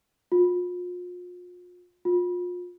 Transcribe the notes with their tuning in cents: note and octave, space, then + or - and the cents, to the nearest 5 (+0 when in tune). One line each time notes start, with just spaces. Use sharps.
F4 +40
F4 +35